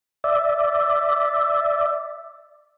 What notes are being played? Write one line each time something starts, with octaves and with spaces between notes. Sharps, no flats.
D5 E5